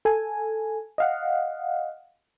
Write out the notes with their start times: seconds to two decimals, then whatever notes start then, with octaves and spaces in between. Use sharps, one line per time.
0.05 A4 G#5
0.98 D#5 F5 F#5